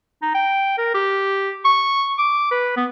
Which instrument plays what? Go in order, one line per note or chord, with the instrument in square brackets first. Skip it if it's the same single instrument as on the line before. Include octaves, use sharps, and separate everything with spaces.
[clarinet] D#4
G5
A#4
G4
C#6
D6
B4
B3